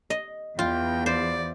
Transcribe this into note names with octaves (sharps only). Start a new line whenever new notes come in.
D#5
E2 F4 G5
C5 D5